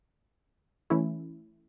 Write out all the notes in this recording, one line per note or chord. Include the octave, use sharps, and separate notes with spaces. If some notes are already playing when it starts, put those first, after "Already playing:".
E3 A3 C#4 E4